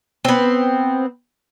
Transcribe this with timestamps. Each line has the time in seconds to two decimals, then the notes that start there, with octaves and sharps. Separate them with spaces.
0.25 B3 C4